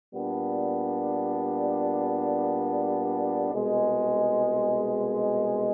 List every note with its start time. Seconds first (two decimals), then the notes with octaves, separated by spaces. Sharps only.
0.13 A#2 G3 B3 D4
3.50 C2 B2 G#3